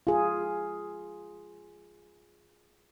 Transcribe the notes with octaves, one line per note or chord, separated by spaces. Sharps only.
F4 G#4